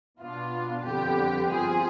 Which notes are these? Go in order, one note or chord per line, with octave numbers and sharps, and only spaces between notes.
B2 B3 D4 F4
F2 D3 G3 B3 G4
G2 F3 C4 F4 G#4